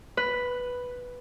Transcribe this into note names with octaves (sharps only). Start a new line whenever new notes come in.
B4